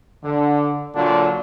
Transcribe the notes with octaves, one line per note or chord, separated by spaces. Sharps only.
D3
A#2 D3 F#3 D4 F4